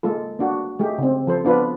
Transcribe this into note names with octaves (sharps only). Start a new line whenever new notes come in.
G#3 A#3 F4 A4
A#3 D4 F#4
G#3 A3 G4
C#3 C4
F3 A4 C5
B3 D4 F4 B4